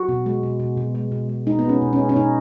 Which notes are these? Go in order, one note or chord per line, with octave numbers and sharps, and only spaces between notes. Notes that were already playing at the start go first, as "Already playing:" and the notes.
Already playing: F#4
B2
G#3
B2
B2
B2
G#3
B2
G#3
G#3 D#4
B3
G#3 C#4
B2
C#4
G#3
C#4
B2 D#4